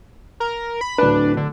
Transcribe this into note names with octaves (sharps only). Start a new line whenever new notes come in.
A#4
B5
D1 D4 B4
D3